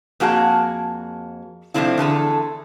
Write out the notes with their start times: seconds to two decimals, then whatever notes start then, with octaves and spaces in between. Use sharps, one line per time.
0.20 F2 A#3 F#4 G#4 A5
1.74 C3 F3 A3 C4 D4 E4
1.98 E2 D3 G#4 A4